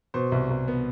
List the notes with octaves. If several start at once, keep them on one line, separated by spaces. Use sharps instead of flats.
B2 C5
C2
C2
B3